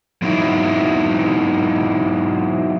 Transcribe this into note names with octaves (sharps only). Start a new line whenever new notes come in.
F#3 B3 D#4 E4